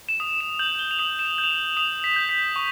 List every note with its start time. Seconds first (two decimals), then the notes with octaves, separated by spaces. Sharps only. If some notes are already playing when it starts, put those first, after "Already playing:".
0.09 E7
0.20 D#6 F7
0.41 E7
0.59 G6 F#7
0.79 G7
0.91 F7
0.99 D#6 F#7
1.19 E7
1.25 F7
1.38 G6
1.44 F7
1.51 F#7
1.77 D#6 F7
2.04 B6
2.16 G6
2.29 B6
2.56 C#6